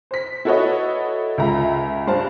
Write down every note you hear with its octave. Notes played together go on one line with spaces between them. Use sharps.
C5 B6
E4 F#4 A4 B4 C#5 D#5
C#2 F4 E5 A#5
G2 C5 F5 A5